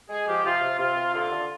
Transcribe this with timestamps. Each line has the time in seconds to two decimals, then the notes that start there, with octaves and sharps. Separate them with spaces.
0.10 G#3 G#4
0.27 F3 G4
0.44 C3 F4
0.61 C3
0.79 C3 F4
0.96 C3
1.14 D3 F4
1.31 D3